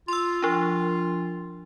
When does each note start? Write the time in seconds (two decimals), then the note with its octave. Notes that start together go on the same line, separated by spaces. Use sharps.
0.08 F4 C6 E6
0.42 F3 D4